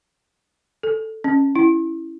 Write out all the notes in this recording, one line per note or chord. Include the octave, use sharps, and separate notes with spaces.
A4
C#4
E4